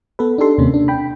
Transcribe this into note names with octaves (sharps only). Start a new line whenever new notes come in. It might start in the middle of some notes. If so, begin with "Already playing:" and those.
B3 A4 B4
D4 D#4 G4 A4 C6
D#2 C3 A#3 C#4
D4
G5 B5